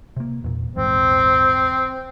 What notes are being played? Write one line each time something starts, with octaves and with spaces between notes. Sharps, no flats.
C3 A#3
E2 A#2
A#1 E2 G#2 C4